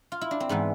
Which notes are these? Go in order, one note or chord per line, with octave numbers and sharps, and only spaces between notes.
F4
E4
D4
C4
G#2 E3 B3